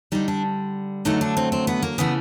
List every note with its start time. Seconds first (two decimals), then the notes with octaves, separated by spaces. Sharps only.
0.12 D3 G3 D#4
0.28 D4
1.05 D3 F#3 A3 D#4
1.21 D4
1.37 C4
1.52 C4
1.67 B3
1.83 A#3
1.98 C#3 E3 A3 B3